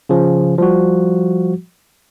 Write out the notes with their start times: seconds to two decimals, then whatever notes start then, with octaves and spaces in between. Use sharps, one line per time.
0.09 C#3 F3 C#4
0.58 F3 G3 F#4